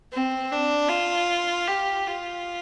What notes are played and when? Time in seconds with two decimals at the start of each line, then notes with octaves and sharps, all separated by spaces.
0.12 C4
0.52 D4
0.90 F4
1.67 G4
2.07 F4